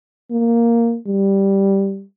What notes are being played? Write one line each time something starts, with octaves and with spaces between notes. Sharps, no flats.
A#3
G3